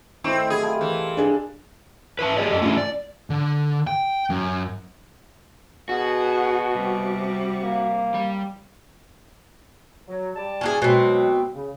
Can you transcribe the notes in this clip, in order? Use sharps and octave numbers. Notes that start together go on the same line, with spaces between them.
D#3 A3 C4 E4 C#6
C3 F#3 E4 G#4
F4 F5 G5 A5
E3 A#4 C5
D4 G#4 D5
B4 E5 A5
G4 G#4 D5 D#5
F#2 A4 D#5
A3 C#4 D4 E4 F4 G#4
D5
D3
G5
F#2
B2 F#4 G#4
C3 G3
A#3
G3
F#3
G3 D5 A5
C#4 D4 G#4
B2 F#3 G#3 C4
C#3